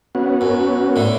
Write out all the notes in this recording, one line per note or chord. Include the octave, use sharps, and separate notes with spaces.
B3 C#4 F#4
F#2
A2 D3